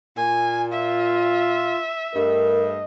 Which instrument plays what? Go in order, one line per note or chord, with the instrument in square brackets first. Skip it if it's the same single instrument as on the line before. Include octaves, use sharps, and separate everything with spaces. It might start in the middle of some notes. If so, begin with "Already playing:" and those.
[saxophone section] A#2 [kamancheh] G#5
[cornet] F4 [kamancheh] E5
[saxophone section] G2 A3 [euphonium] A#4 [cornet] D#5